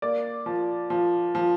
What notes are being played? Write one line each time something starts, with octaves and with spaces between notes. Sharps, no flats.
A#3 D5
F3
F3
F3